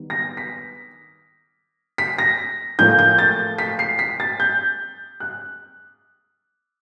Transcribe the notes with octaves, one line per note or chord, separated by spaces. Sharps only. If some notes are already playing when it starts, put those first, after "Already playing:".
Already playing: D#3 G3 B3
A#6
B6
B6
A#6
A2 F3 A#3 G6
G6
A6
B6
C7
B6
A6
G6
F#6